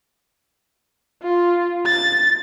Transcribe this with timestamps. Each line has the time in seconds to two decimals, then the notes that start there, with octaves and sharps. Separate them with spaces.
1.23 F4
1.86 A6